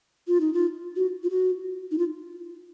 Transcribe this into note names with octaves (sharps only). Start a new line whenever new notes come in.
F4
D#4
F4
F#4
F4
F#4
D#4
F4